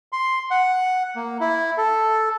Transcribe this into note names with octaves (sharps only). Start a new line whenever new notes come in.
C6
F#5
A#3
E4
A4